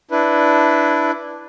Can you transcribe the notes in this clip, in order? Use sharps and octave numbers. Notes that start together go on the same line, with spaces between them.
D4 E4 B4